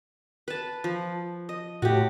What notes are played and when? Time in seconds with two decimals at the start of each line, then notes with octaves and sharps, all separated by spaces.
0.48 B4 A5
0.84 F3
1.49 D#5
1.82 A2 F#4 G4